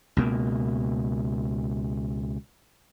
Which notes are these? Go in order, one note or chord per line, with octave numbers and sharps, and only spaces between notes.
C#2 B2 A#3